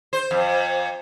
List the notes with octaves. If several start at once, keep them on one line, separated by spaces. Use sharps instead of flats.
C5
F2